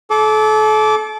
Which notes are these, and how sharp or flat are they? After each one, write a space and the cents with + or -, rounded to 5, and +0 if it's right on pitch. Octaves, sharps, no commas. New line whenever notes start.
A4 -35 D6 -15